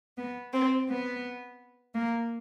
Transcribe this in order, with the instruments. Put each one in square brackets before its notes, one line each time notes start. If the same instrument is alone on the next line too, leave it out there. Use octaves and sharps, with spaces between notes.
[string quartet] B3
C4
B3
A#3